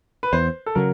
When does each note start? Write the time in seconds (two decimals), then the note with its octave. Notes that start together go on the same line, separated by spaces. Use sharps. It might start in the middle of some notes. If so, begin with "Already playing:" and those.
0.23 B4
0.33 E2 C5
0.66 A4
0.75 C#3 F#3 A#4